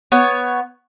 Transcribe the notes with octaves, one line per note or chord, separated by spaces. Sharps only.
B3 C#5